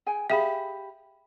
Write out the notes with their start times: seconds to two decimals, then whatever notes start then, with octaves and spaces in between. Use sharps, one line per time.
0.06 G#4 G5 G#5
0.30 G4 G#4 E5 F5 B5